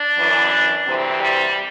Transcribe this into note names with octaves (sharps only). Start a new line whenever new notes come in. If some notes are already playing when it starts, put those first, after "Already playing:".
Already playing: D4
F#2 E3
D2 C3 E3 C4
G3